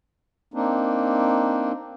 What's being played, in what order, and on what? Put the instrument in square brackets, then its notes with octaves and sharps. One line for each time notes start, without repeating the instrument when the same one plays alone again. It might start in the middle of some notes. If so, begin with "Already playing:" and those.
[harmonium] A#3 C4 D4 D#4